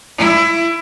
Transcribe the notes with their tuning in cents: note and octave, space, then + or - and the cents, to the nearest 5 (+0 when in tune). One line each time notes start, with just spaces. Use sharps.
E4 +20